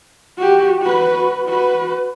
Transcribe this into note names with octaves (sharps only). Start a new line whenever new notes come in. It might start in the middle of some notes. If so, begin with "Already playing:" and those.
F#4 G4
F#4 B4
F#4 B4